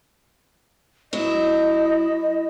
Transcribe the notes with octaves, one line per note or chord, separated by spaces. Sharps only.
F#3 E4 D#5